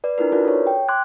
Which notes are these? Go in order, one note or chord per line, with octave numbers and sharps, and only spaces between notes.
B4 D5
D4 E4 F4 A#4 B4
D#4 F4 F#4 A#4 B4 D5
A4 C#5
G5
C6 D6 F#6 G#6